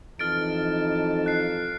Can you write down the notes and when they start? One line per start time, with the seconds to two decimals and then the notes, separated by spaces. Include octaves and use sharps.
0.19 F2 E3 D#4 A5 F6 A6 D7
1.26 F#6 C7